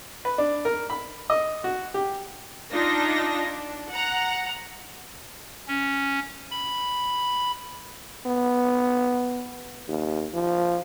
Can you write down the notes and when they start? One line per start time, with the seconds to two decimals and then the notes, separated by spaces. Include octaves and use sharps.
0.25 B4
0.38 D4
0.65 A#4
0.90 B5
1.30 D#5
1.64 F#4
1.94 G4
2.71 D4 D#4 F4 A#6
3.46 D4
3.89 F#5 A#5
5.68 C#4
6.51 B5
8.26 B3
9.88 D#2
10.34 F3